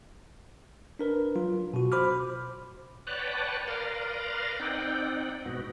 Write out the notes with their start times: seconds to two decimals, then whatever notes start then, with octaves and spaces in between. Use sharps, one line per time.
0.99 D4 A#4 B4
1.36 F#3 F4
1.74 B2 F#4
1.92 C5 B5 D6 F6
3.07 B4 C#5 D5 F#5 G5 A5
3.68 A#4 B4 D5 F5 A#5 C6
4.60 C4 D#4 D5 F#5 G5
5.45 G#2 B2 B3 F#4